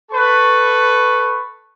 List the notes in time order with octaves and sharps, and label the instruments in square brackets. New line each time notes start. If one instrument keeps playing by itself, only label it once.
[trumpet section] A4 B4 C#6